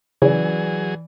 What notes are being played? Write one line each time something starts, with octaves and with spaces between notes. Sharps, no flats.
C#3 E3 F#3 G#4 D5